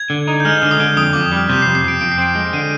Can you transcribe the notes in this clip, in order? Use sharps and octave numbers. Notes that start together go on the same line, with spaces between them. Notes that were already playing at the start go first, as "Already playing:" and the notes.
Already playing: G#6
D3
D#4
G6
G#3 F6
D3 F6
D#6
D3
F2 D#6
F2 D6
D#6
G3
F6
C3 G6
C7
F2
C7
F2 D7
F2 D7
C7
C4 D7
G#3
D7
D3 D#7